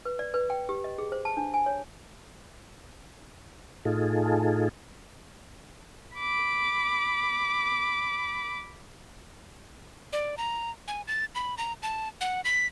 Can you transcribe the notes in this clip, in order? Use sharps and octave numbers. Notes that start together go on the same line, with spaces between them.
B4
D5
B4
G5
G4
D#5
G#4
C5
A5
D4
G#5
C#5
A2 D#4 F4 G#4 A4
B5 D6
D5
A#5
G#5
A6
B5
A#5
A5
F#5
B6